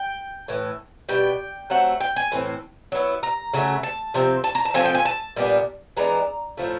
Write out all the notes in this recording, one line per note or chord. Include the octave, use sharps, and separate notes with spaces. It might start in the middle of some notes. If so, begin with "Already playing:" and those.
Already playing: G5
A2 E3
B2 G3 G5
F#3 A3 C4 F#5
G5
G#5
A2 E3 C4
F#3 B3 E4
A#5
C#3 F#3 A3
A5
C3 F3 C4
A5
A#5
A5
F3 A3 C4 F4 G#5
G5
G#5
A5
A#2 G3 B3 D4
E3 G#3 B3 D4 A#5
A2 F3 A3